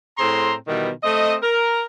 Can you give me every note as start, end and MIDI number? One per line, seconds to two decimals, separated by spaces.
0.18 0.54 45
0.18 0.54 60
0.18 0.54 68
0.18 0.54 82
0.18 0.54 84
0.68 0.90 47
0.68 0.90 51
0.68 0.90 52
0.68 0.90 55
0.68 0.90 59
1.03 1.35 57
1.03 1.35 60
1.03 1.35 75
1.42 1.82 70